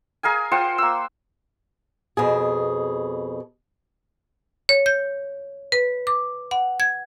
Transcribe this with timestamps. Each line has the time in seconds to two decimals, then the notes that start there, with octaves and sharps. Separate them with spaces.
0.23 G#4 A#4 F5 G#5
0.51 F4 C5 F#5 G5
0.78 A#3 E6
2.17 F2 B2 G#4
4.69 C#5
4.86 G6
5.72 B4
6.07 D6
6.51 F#5
6.80 G#6